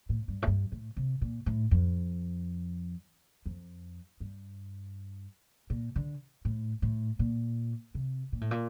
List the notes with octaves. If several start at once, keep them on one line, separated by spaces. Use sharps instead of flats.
A2
G2
A2
G2
A2
C3
A#2
A2
F2
F2
G2
A#2
D3
A2
A2
A#2
C3
A#2
A2
A#2